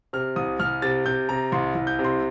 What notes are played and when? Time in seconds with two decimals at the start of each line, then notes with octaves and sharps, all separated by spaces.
0.13 C3 F6
0.36 C2 D#6
0.60 C2 F6
0.82 C3 A6
1.06 C3 G6
1.29 C3 A#5
1.52 C2 C6
1.75 C2
1.87 G6
1.99 C3
2.04 C6